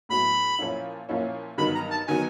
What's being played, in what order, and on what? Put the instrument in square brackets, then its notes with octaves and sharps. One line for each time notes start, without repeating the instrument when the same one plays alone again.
[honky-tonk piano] A2 F#3 B3 E4 [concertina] B5
[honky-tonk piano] A#2 F3 A#3 C#4 E4
A#2 F3 A#3 C#4 E4
[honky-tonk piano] G2 D#3 F#3 B3 D#4 [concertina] B5
[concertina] A#5
A5
[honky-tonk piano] D#3 F#3 B3 D#4 [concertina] G#5